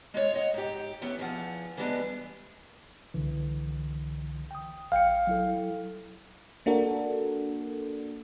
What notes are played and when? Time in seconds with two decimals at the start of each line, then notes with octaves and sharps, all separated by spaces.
0.14 G#3 F4 C#5
0.34 C#5 D#5 F#5
0.54 G#2 G4
1.01 E3 B3 C#4
1.19 E2 E3 F3 F#5
1.77 E3 G3 G#3 B3 C4 D4
3.14 C2 D3 E3
4.51 G5 D#6
4.92 A#1 F5 G5 C#7
5.27 F#3 E4 A4
6.66 A#3 D4 F#4 A4 A#4